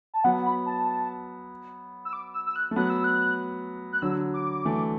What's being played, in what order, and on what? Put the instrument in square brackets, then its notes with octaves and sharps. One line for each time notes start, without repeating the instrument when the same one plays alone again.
[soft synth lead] A5
[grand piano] F#3 B3 [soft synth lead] F#5
[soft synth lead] B5
A5
E6
D6
E6
E6
F#6
[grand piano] A3
[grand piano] F#3 B3 [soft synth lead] F#6
[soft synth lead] E6
F#6
F#6
[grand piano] D3 F#3 [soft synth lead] E6
[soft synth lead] D6
[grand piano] E3 A3